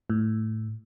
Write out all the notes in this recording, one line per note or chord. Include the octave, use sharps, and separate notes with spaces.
A2